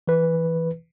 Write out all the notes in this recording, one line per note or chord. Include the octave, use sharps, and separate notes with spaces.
E3 B4